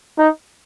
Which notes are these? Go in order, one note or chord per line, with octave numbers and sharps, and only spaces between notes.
D#4